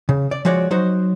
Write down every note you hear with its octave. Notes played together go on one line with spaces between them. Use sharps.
C#3
D5
F3 G#3 F#4 C#5 D5
F#3 D#4 F#4 C5